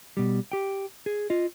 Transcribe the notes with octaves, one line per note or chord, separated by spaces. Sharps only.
B2 G3
G4 G5
G#4
F4 D#5